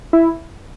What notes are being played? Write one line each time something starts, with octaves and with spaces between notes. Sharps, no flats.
E4